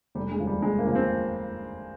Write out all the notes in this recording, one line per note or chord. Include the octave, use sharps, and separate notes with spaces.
F1 G3
G#3
D#2 C#3 F3
G3
F1 G#3
A#3
D#2 C#3 F3
C4